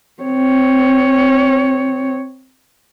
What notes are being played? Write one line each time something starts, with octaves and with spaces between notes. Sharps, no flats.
C4 C#5